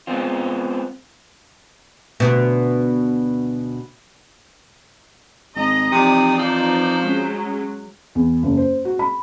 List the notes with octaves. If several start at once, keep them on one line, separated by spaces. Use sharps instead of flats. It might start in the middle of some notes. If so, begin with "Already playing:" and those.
G#3 B3 C4 F4
D2 B2
G#1 D#5 A#5
F2 C3 E3 D#4 D5 D#6
F3 C5
F#3 G#3 C#4
E2
F#1
C5
F#4
B5